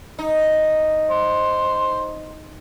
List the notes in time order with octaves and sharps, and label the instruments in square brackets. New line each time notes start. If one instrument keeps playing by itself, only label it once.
[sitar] D#4
[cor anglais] C5